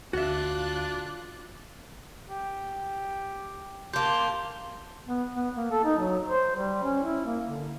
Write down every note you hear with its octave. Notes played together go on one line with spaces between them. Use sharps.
D2 D4 F4 F#4 E5 F#6
G4
A#3 G4 A5 C6 G6
B3
B3
A#3
A4
D#4
F#3
C5
G3
C#4
E4
A#3
D3